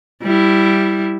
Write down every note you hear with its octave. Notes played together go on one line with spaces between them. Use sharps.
G3 E4